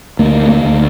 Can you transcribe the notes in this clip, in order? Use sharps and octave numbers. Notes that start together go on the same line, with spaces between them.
D2 A#3
A#3
D2